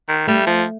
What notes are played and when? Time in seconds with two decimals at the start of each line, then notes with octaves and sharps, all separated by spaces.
0.09 D#3
0.27 G3 A3
0.47 F3